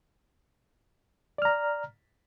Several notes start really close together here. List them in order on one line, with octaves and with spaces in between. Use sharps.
D5 F6 A#5